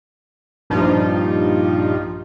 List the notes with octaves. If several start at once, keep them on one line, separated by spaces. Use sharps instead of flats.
A#1 G2 F3 G3 D#4 F4